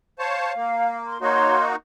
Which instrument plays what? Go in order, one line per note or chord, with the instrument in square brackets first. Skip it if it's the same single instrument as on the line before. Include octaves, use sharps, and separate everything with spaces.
[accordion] C5 C#5 A5 [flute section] F5
[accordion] A#3
[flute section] C6
[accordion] A#3 D#4 F#4 [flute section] C#5 C6